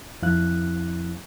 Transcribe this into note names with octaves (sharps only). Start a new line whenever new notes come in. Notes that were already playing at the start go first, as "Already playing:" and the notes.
F2 F3 C4 E4 F5 F#6